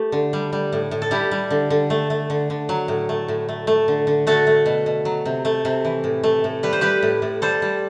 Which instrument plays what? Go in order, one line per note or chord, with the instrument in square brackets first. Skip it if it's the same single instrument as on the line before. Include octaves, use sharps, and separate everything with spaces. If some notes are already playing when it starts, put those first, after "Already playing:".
Already playing: [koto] A3 G4
D3
G3
G3
A2
A2
A4
G3 E4 G4
G3
D3
D3
A3
A3
D3
D3
F#3
A2
A3
A2
A3
A3
D3
D3
A3 F#4 A4
A3
B2
B2
F#3
C3
A3
C3
E3
A2
A3
A2
G3 B4
C5
G3 G4 B4
A2
A2
G3 A4 C5
G3